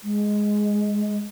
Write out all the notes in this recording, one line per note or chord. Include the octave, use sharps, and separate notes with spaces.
G#3